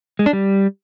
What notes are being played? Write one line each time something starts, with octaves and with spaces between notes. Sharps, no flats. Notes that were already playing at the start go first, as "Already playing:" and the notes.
G#3
D4
G3